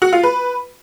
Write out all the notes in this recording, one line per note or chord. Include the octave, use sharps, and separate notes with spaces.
F#4
F4
B4